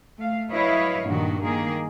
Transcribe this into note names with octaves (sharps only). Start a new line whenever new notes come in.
A3 F5
F#3 E4 B4 C#5 D#5 F5
G2 A#2 D#3 F#4
D#3 A#3 G#4